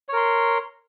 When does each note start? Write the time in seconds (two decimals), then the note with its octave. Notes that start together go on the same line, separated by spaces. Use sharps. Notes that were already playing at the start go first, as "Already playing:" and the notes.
0.09 C#5
0.13 A#4
0.17 C6